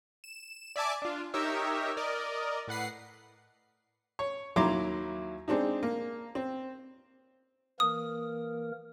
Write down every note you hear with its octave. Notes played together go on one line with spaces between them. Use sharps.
E7
D5 E5 G#5 A5 D6
D4 F4
D#4 G4 A#4 C#5 E5
A#4 D5 D#5
A2 B4 F#5 C7
C#5
D#2 F#3 E4 A#5 C6 D6
G#3 C4 D4 D#4
A#3
C4
E3 A#3 A#4 D#6